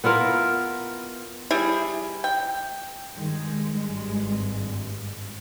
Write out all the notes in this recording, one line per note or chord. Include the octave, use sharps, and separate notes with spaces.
B3 E4 F4 A#4
G3 E4 G#4
G5
G2 D#3 G#3
G#1 G2